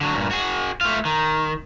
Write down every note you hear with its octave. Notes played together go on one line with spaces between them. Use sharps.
D3 F#3
G2 A#2
F#4 G#4
A3 F4
D#3